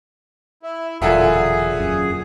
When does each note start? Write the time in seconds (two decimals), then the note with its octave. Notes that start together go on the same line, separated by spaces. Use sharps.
0.63 E4
1.02 E1 A#2 D3 F#3 G#4 E5 F#5 G#5
1.80 F#2